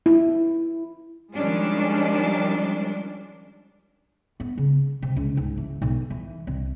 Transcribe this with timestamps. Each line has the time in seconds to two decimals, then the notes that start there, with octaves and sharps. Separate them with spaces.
0.06 E4
1.35 D#3 F3 G3 G#3 C#4 D4
4.40 B3
4.58 C#3
5.02 C3
5.16 C#2
5.37 G#2
5.57 E3
5.82 B1
6.10 E3
6.47 C2